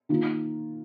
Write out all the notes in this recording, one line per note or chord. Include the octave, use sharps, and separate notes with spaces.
D#3 A#3 F4